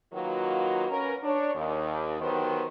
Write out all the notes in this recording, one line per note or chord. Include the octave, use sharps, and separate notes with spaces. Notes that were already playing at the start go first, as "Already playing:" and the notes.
D#3 F#3 A#3 F4 F#4 B4
C#4 A#4 B4
D4 C#5
D#2
D#3 E3 F#3 B3 G4 C5